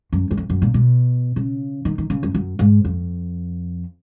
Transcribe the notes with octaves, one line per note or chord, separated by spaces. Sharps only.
F#2
F#2
F2
F#2
A#2
B2
C#3
D#3
D#3
C#3
F#2
F#2
G#2
F2